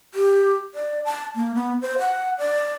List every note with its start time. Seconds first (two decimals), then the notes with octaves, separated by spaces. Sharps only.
0.14 G4
0.75 D5
1.05 A5
1.36 A#3
1.55 B3
1.82 C5
1.99 F#5
2.38 D5